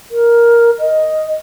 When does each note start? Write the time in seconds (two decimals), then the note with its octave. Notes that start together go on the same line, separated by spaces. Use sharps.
0.11 A#4
0.79 D#5